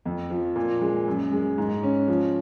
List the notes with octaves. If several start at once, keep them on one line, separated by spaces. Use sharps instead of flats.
F2
F3
A#2
G#3
F#2
G#3
G#2
C#4
F3